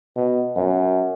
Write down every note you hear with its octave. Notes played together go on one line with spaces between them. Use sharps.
B2
F#2